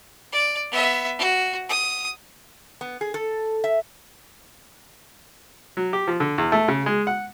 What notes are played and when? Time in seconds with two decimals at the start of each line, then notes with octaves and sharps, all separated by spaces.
0.32 D5
0.71 B3 E5
1.19 F#4
1.69 D#6
2.81 B3
3.01 G#4
3.14 A4
3.64 E5
5.77 F#3
5.93 G4
6.08 F3
6.20 D3
6.38 E2
6.52 A3
6.68 C#3
6.86 G#3
7.07 F#5